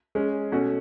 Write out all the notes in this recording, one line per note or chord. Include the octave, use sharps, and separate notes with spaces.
G#3 C#4 G#4 C#5
B2 A3 C#4 F#4